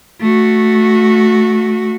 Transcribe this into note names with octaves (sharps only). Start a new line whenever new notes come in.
A3 F#4